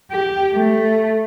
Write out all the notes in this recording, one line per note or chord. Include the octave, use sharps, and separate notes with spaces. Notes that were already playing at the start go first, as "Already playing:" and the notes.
G4
A3